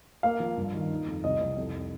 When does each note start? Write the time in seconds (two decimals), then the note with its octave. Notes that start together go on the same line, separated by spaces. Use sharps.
0.23 A#3 F5
0.40 F3
0.57 G2
0.74 D#3
0.91 D#4
1.07 F2
1.24 C2 D#5
1.41 C2
1.57 F2